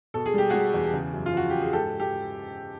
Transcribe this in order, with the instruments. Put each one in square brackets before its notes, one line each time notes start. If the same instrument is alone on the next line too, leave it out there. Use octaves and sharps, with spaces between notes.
[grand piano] B2 A4
G#4
G3 G4
G3 F#4 G#4
E2
C#3
F#2
F4
F3 F#4
F#2 G4
G#4
G#2 G4 A4
G4 A4